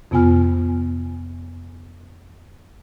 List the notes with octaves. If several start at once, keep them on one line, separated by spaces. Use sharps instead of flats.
F2 C3 B3 F4 G#5 F6